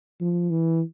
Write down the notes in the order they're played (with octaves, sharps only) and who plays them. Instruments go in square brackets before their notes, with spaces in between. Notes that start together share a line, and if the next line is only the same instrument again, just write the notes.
[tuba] F3
E3